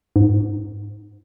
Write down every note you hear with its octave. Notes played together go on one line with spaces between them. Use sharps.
G#2